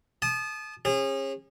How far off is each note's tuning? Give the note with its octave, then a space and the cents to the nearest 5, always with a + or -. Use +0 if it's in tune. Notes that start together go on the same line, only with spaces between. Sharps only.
A5 -35 D#6 -25
C#4 -35 G#4 -30